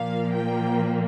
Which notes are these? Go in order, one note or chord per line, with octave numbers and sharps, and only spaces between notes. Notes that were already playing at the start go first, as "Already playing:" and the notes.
Already playing: A#2 F3 A#3 F5
G5